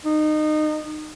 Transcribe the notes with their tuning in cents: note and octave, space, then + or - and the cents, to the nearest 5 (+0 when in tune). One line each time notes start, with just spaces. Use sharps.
D#4 -25